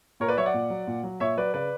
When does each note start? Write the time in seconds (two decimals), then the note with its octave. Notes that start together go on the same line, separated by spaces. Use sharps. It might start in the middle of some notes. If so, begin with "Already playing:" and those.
0.20 A#2 A#4 C#5
0.29 B4 D5
0.37 F#3 C#5 E5
0.46 D5 F#5
0.54 A#2
0.70 F#3
0.87 A#2
1.03 F#3
1.20 A#2 C#5 E5
1.37 F#3 B4 D5
1.54 C#3 B4 D5